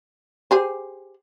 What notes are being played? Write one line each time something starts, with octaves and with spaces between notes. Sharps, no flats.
G4 G#4 C5